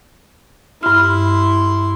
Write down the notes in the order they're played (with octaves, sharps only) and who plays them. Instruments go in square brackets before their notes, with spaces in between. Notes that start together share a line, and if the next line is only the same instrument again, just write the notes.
[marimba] G2 F6 [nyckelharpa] E4 C6